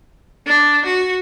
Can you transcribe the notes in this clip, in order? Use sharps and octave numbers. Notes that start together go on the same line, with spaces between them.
D4
F#4